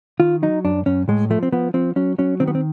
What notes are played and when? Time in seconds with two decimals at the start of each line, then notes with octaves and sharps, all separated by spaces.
0.20 D#3 F4
0.42 F#3 D#4
0.65 F#2 D4
0.86 F#2 C#4
1.09 A2 G#3
1.30 F3 A3
1.43 C4
1.52 F3 B3
1.74 F3 C4
1.96 F#3 C#4
2.18 F#3 C#4
2.40 D#3 C4
2.48 B3
2.55 C4